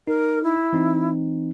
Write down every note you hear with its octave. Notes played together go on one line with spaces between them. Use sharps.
D#4 A#4
E4
E3 C4 D#4